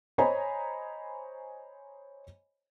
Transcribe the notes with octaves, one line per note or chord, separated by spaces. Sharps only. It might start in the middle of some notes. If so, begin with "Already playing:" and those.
C5 C#5 D#5 G#5 A#5 B5